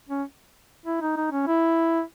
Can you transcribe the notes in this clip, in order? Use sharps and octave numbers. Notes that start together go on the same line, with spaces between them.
C#4
E4
D#4
D#4
C#4
E4